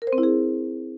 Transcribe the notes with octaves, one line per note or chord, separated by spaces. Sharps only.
A#4
C5
C4
E4
G#4